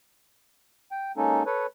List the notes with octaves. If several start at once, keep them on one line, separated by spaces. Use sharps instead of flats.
G5
G#3 A#3 C#4 D#4 A4
A4 B4 C#5